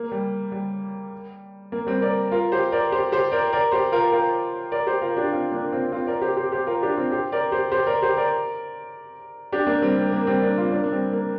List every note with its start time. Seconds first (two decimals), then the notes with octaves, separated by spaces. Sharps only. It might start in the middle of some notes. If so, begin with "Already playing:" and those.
Already playing: A#3
0.12 G3
0.52 G3
1.72 A#3
1.87 G3 C4
2.02 A#4 D5
2.32 F4 A#4
2.52 G4 C5
2.72 A#4 D5
2.92 G4 C5
3.12 G4 C5
3.32 A#4 D5
3.53 A#4 D5
3.72 G4 C5
3.92 F4 A#4
4.12 F4 A#4
4.72 A#4 D5
4.87 G4 C5
5.02 F4 A#4
5.17 D4 G4
5.32 C4 F4
5.52 A#3 D4
5.72 C4 F4
5.92 C4 F4
6.07 A#4 D5
6.22 G4 C5
6.37 G4 C5
6.52 G4 C5
6.67 F4 A#4
6.82 D4 G4
6.97 C4 F4
7.12 G4 C5
7.32 A#4 D5
7.52 G4 C5
7.72 G4 C5
7.87 A#4 D5
8.02 G4 C5
8.17 A#4 D5
9.52 D4 G4
9.67 A#3 D4
9.82 G3 C4
9.97 A#3
10.12 A#3
10.27 G3 C4
10.42 A#3 D4
10.57 C4 F4
10.72 A#3 D4
10.84 D4
10.92 G3 C4
11.13 A#3